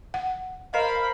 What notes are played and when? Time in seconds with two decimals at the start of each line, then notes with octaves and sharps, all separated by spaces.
0.14 F#5
0.74 A#4 C5 D#5 F5 B5